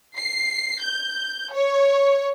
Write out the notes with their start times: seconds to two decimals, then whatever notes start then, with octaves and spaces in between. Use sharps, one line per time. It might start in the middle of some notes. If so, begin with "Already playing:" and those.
0.17 C7
0.81 G6
1.52 C#5